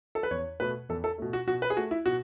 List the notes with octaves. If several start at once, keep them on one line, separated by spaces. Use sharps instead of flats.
A4
B4
E2 C#5
B2 A3 B4
E2 A4
A4
B2 A3
F#4
B2 F#4
B4
G#4
A3 F#4
E4
B2 F#4